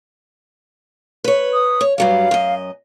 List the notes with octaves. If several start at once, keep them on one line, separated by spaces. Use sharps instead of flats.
B4 C#5
D#6
C#5
G2 F#3 G3 F5
F#2 D#5